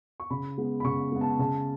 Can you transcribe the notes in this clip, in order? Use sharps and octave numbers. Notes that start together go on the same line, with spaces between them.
C#6
C#3 B5
G#3 B3
B5
C#3 C#6
G#3 B3
A5
C#3 A5